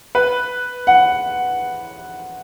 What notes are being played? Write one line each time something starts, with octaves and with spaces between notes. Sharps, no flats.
B4
F#5